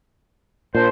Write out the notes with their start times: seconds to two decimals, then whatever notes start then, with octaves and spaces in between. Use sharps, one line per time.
0.75 A#2 D4 A#4 C5